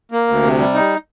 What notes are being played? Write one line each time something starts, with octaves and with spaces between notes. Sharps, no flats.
A#3
D2
C3
G3
D#4